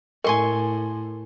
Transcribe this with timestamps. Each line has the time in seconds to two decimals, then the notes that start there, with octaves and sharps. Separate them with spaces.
0.24 A2 A#4 G#5 C6 C#6